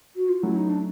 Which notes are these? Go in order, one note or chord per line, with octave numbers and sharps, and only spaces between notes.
F#4
F4
F#3 A3 C#4 E4
D#4
D4